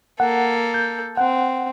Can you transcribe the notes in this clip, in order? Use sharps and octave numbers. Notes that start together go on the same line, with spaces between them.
A#3 A4 F#5
G6
C4 F#5